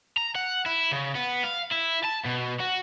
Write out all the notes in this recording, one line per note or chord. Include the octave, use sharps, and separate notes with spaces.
A#5
F#5
E4
C#3
B3
F5
E4
A5
B2
F#4